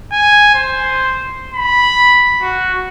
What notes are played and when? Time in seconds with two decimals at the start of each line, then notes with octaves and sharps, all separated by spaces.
0.12 G#5
0.55 C5
1.53 B5
2.42 F#4